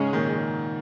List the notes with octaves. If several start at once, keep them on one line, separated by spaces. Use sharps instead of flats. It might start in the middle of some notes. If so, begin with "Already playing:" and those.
Already playing: G#2 C#3 G#3 C#4 G#4
A#2 D#3